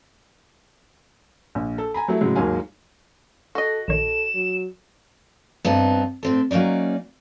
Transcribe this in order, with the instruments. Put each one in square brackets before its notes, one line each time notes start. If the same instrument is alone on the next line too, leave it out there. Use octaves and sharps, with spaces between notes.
[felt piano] A#1
A4
G#5 A#5 B5
F#3 A3 E4
A2 C#3 F#3 G#3
D#2 G#2 D#3 F#3 F5 G#5
[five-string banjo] F#4 D#5 [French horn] A4
[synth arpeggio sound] A#1 D#3 C#5 [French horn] A4 [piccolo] E7
[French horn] F#3
[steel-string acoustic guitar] G2 B3 C4 D#4 A5
A2 C4 A4
F#3 A#3 C#4 D#4 D5